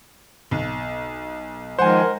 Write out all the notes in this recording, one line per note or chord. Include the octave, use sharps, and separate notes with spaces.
B1
D#3 F3 G#3 A#4 C5 F#5 G#5